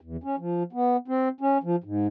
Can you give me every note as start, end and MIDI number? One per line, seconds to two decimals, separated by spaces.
0.01 0.17 40
0.24 0.36 61
0.38 0.63 53
0.73 0.97 59
1.08 1.28 60
1.41 1.58 61
1.63 1.76 53
1.84 2.07 44